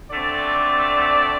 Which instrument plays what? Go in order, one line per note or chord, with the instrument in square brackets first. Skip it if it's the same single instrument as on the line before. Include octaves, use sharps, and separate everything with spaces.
[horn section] D3 A3 C4 D5